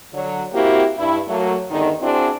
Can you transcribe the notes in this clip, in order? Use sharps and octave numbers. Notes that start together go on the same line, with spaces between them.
D3 F#3
A#3 C4 E4 F#4 G4
G2 E4
F#3 A3 A#3
E2 G2 D3 D#3
C4 D4 E4 F#4 G#4 C5